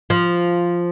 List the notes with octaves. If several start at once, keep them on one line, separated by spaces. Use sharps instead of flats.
F3